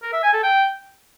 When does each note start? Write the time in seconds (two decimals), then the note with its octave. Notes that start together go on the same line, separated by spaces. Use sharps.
0.03 A#4
0.13 E5
0.23 G#5
0.33 A4
0.44 G5